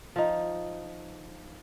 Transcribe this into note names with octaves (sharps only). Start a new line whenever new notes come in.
F3 D#4